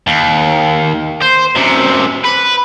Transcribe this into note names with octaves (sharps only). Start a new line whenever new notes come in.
D#2
C5
F#2 C3
B4